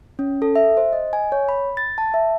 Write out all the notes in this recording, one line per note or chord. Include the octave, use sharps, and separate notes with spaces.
C#4
A4
E5
C5
D#5
G#5
C#5
B5
A6
A5
E5